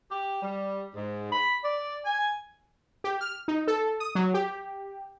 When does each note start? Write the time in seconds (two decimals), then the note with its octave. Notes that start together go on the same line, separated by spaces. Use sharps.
0.11 G4
0.43 G3
0.95 G#2
1.33 B5
1.64 D5
2.05 G#5
3.04 G4
3.21 F6
3.48 D#4
3.68 A4
4.00 D#6
4.15 F#3
4.34 G4